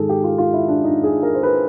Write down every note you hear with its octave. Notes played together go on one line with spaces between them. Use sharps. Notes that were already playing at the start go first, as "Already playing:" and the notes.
Already playing: G#2 D#3 G#4 A4
G4
F4
F4
E4
D4
D#4
G#4
A#4
C5
B4